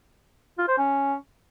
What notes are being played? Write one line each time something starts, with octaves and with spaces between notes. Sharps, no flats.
F4
C5
C#4